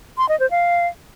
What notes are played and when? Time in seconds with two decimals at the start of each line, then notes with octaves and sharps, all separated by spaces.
0.18 C6
0.29 D#5
0.40 C5
0.51 F5